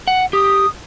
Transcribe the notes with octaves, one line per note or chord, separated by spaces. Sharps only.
F#5
G4 D#6